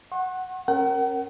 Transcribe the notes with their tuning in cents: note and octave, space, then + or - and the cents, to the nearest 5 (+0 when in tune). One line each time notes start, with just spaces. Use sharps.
F#5 +0 C#6 -45
C#4 -35 A#4 +0 F#5 +40